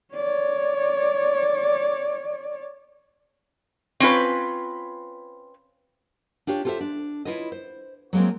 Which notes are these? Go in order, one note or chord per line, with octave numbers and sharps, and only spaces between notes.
C#5 D5
C4 C#4 F4 B4
D4 F4 G4 C#5
F4 G4 A4 A#4 C5 E5
D4
E4 F4 B4 C#5 D#5
C5
F#3 G#3 A#3 C4